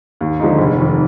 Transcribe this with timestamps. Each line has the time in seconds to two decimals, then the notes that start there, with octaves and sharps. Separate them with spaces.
0.21 D#2
0.40 D3 F3 G#3 D#4
0.58 F1
0.78 F2 D#3